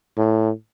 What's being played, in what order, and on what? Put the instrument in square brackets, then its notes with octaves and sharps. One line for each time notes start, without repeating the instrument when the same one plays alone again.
[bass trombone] A2